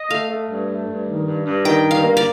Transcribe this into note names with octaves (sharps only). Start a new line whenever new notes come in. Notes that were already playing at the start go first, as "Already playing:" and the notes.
Already playing: D#5
A3 F5
A3
G2
A3
G2
D#3
G2
G2
D#3 G5
G2
F5
A#3
D5